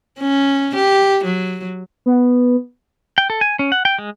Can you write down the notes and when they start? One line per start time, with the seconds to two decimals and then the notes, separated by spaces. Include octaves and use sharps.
0.19 C#4
0.75 G4
1.24 F#3
2.06 B3
3.18 G5
3.30 A4
3.41 G#5
3.59 C#4
3.72 F#5
3.85 G5
3.99 G#3